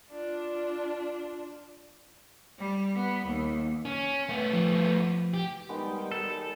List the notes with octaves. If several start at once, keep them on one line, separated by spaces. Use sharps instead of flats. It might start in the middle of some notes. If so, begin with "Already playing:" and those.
D4 F4
G3
B3
D#2
C#4
A3 B3
F3
G4
D#3 G3 G#3 B3 D#4 G5
A4